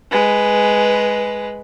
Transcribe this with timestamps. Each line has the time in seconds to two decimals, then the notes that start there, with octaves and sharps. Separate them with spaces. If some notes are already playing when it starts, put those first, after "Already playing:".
0.11 G#3 B4